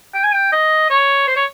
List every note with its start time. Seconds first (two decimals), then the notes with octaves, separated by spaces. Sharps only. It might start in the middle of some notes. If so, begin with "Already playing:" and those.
0.14 G5
0.24 G#5
0.33 G5
0.52 D#5
0.90 C#5
1.28 C5
1.36 C#5